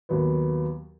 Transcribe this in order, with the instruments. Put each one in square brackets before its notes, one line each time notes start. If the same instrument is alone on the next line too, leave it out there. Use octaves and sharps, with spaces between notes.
[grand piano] D#2 F#3 B3